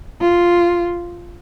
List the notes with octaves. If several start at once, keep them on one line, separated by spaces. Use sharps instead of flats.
F4